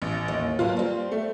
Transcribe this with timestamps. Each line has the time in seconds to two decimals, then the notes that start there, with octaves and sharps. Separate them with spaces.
0.02 A1
0.28 D#2
0.59 B2 F#3 A#3 F4
0.77 G3 C4
1.12 A3